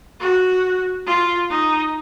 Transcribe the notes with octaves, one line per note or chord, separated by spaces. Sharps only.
F#4
F4
D#4